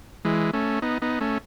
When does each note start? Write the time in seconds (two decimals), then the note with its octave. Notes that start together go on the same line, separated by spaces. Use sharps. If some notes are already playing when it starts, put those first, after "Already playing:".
0.25 E3 G#3
0.53 A3 C#4
0.82 B3 D#4
1.02 B3 D#4
1.21 A3 C#4